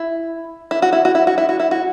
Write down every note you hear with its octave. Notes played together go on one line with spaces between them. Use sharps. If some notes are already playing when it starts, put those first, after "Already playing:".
Already playing: E4
E4
F#4
E4
F#4
E4
F#4
E4
F#4
E4
F#4